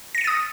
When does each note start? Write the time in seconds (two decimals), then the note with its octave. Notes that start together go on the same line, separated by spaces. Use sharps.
0.15 A#6
0.18 C#7
0.21 D#7
0.24 A6
0.27 D#6